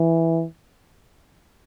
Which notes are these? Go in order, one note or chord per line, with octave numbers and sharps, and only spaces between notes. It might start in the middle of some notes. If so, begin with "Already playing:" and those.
Already playing: E3